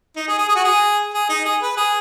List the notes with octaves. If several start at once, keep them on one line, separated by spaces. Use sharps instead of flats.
D#4
G#4
G#4
G#4
F#4
G#4
G#4
D#4
G#4
B4
G#4